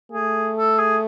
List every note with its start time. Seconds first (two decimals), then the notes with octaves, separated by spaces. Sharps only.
0.12 A3 G#4
0.57 A4
0.79 G#4